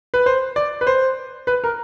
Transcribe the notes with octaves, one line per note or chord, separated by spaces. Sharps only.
B4
C5
D5
B4
C5
B4
A#4